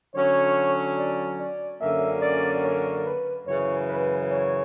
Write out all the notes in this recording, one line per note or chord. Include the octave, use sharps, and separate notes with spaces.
D3 F#3 C#4 C#5
D5
D5
F#2 D3 A#3 C#4 E5
D5
C#5
B4
F#2 C#3 E3 C#5
B4
C#5